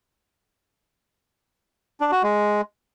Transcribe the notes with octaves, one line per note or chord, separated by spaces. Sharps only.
D4
F#4
G#3